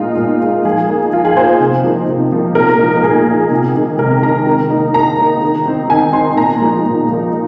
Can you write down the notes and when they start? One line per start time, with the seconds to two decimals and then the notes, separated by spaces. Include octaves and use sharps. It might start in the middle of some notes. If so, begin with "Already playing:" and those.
Already playing: A#2 G#3 D#4 F4
0.17 A#2
0.41 G#3 D#4
0.65 F3 G#4
0.89 A#3 D#4
1.13 F3 F4
1.25 G#4
1.37 A#3 D#4 C5
1.60 C3
1.84 F3 A#3 D#4
2.08 C3
2.32 F3 A#3 D#4
2.55 A#2 A#4
2.79 F3 A#3 D#4
2.97 A#4
3.03 A#2 G#4
3.27 F3 A#3 D#4
3.51 C3
3.75 D#3 G#3
3.98 C3 A#4
4.23 D#3 G#3 A#5
4.47 D#3
4.70 A#3 D#4
4.94 D#3 A#5
5.18 A#3 D#4
5.42 D#3
5.65 C4 D#4
5.89 D#3 G#5
6.13 C4 D#4 C6
6.37 A#2 A#5
6.61 F3 A#3 D#4
6.86 A#2
7.09 F3 A#3 D#4